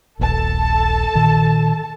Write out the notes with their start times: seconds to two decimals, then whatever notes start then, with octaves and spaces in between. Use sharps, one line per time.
0.19 D#1 A#1 A4 A5
1.15 A#2 D#3